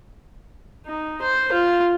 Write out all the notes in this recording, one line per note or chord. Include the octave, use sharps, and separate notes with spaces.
D#4
C5
F4